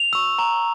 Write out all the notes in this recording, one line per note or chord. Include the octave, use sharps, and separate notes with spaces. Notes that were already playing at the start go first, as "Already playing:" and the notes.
Already playing: F7
C#6 E6
A#5